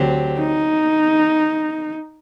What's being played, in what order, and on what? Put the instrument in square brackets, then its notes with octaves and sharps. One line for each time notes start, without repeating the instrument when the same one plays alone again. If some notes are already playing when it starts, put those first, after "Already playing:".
Already playing: [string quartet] D2 D3 F#3 C4 G4
[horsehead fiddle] D#4